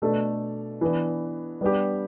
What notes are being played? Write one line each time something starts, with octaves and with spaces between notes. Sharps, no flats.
B2 A3 D4 A4
E3 B3 D4
G3 B3 D4 G4